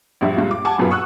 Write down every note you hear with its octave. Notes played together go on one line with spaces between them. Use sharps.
A#1 G2 E5
C#2 G2 A#2
D6
F#5 G#5 A5 D6
F#1 B1 F#2 A#2 B3 B5
F#5 C#6 D#6 E6 F#6